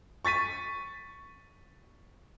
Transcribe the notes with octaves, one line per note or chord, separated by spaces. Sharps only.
C#6 A6 B6 D#7